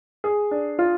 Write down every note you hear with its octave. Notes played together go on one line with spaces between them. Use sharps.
G#4
D4
F4